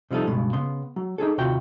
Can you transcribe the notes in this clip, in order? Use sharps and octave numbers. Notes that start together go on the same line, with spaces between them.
C3 F3 G3 D#4 A4
C#2 G2 B2 G#3
C#3 B3 C6
F#3
D#4 E4 G#4 A4
D#2 C3 F4 F#4 G5